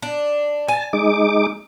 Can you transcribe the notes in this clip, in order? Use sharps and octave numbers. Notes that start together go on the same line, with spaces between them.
D4
G#5 A5
G#3 D#4 D6